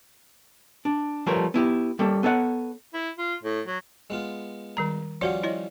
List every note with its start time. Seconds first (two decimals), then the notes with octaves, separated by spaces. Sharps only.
0.85 D4
1.26 F3 G3 A3 A#4 B4 C#5
1.54 B3 E4 G4
1.99 G3 A#3 C#4 A4
2.23 B3 A4 C#5 F5 F#5
2.94 E4
3.18 F4
3.43 A2
3.67 F#3
4.10 G#3 B3 F4
4.77 D#3 G3 A#5
5.21 F3 G3 C#4 F#4 C5 F#5
5.43 E4 C#5 D#5